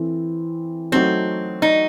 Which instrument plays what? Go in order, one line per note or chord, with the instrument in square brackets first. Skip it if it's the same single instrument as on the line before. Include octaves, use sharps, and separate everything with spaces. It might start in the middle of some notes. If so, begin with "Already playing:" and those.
Already playing: [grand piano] E3 C4 A4
[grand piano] F#3 A3 D#4 F#4 A4 [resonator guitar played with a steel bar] C4
[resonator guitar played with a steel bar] D#4